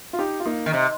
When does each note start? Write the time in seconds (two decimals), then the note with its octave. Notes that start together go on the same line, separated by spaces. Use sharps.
0.13 F4
0.19 D#4 G4
0.40 F4
0.46 A#3 D#4
0.66 D#3
0.73 C3